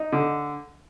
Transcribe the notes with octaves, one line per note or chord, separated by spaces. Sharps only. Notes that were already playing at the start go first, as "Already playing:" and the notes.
Already playing: D#4
D3